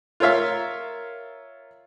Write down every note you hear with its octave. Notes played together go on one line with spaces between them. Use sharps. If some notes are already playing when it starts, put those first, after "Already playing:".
F4 A#4 C#5 E5 F5